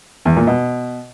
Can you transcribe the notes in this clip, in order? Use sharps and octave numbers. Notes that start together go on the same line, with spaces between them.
E2
A#2
B2